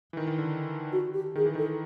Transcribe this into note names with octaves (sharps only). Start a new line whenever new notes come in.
E3
D#3
D#3
D3
F#4
G4
D#3 G#4
E3
D#3 A4